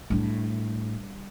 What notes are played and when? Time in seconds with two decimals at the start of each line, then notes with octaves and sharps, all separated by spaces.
0.10 A2 G3 D4